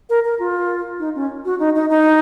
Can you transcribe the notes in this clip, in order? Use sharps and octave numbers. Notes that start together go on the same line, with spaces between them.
A#4
A#4
F4
D#4
C#4
F#4
D#4
D#4
D#4